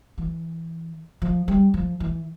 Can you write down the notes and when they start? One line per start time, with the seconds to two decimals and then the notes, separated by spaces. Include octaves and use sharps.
0.18 E3
1.22 F3
1.48 G3
1.74 F3
2.00 E3